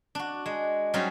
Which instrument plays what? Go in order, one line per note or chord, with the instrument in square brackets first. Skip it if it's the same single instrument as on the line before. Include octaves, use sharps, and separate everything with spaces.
[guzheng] D4 F#4
G#3
F#3 G3 C#4 D#4 F#4 C5